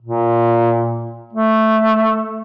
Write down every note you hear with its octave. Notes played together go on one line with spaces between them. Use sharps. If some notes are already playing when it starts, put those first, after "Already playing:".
A#2
A3